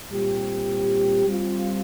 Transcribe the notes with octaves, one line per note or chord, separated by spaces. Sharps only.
A#2 G3 C4 G4
G3 C4 F4